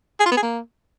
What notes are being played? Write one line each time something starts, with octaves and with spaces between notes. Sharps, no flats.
G#4
F4
B3
G#4
A#3